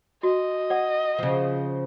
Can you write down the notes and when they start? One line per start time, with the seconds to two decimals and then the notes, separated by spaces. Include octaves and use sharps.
0.23 F#4 D#5
0.70 D5 F#5
1.19 C#3 F3